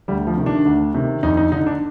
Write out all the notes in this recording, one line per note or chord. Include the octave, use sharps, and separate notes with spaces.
D2 G3
F3
C3 D#3
D4
D2
C3 D#3
F2 D#4
D#4
D3 D#4
D4